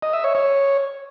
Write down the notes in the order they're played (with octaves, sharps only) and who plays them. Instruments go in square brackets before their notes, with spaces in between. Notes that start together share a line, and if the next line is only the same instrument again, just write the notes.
[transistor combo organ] D#5
E5
C#5
C#5